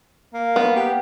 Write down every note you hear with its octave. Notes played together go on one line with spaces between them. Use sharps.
A#3
B3
G4